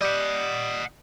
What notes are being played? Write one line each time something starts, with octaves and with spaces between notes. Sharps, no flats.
G3 G4 D#5 F#5